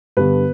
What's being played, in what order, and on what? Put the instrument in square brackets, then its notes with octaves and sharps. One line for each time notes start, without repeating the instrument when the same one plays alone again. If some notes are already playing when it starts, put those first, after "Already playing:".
[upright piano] G2 D3 B3 B4